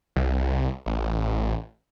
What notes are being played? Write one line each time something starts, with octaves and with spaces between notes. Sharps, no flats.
C2
A1